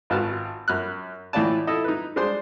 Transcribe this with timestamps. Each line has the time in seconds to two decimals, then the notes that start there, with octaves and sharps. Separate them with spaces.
0.10 G#1 F4 F#4 B4 A5 F6
0.68 F#2 F6 F#6
1.33 A2 E3 F4 D5 A5
1.67 E4 A4 D#5
1.84 D#4 B4
2.16 G#3 D4 C5 C6